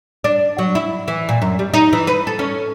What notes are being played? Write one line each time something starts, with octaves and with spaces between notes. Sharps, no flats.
D4
F#3
E4
E3
A#2
F#2
G3
D#4
E3
B4
A4
C#4